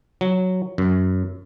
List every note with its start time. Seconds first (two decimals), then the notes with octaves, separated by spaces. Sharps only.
0.21 F#3
0.78 F#2